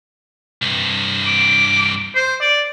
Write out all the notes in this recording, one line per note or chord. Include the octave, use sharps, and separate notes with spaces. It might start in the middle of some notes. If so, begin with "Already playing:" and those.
C2 G2
D6
C5
D5